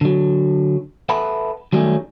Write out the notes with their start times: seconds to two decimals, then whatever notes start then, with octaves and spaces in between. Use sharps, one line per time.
0.01 D3 F#3
1.09 A4 B4 E5 F#5 A5 B5
1.73 D#3 F#3 G3 A3 C#4